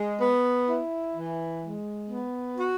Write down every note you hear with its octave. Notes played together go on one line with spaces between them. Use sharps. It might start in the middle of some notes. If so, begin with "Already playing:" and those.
Already playing: G#3
B3
E4
E3
G#3
B3
F#4